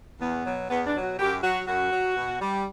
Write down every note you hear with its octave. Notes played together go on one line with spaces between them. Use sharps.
E2 B3
B2 F#3
E2 B3
D4
B2 F#3
F#4
F#2 G4
F#3 F#4
F#2 F#4
F#3
B2
G3